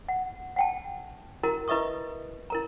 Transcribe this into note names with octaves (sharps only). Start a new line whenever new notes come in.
F#5
F#5 G5 A5
E4 F#4 A#4 A#5
E4 B4 D#5 E5 C#6 D#6
E4 A#4 A#5